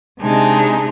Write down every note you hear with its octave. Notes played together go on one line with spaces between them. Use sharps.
C3 G#3 D4 D#4